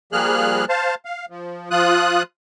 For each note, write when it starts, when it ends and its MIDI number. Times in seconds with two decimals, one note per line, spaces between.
0.13 0.65 53
0.13 0.65 55
0.13 0.65 58
0.13 0.65 68
0.13 0.65 89
0.13 0.65 90
0.69 0.95 72
0.69 0.95 77
0.69 0.95 81
1.05 1.26 77
1.30 1.70 53
1.71 2.23 53
1.71 2.23 65
1.71 2.23 87
1.71 2.23 90